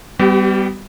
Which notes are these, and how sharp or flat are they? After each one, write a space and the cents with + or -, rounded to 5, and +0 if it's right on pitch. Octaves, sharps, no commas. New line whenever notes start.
G3 +0 B3 +25 G4 -40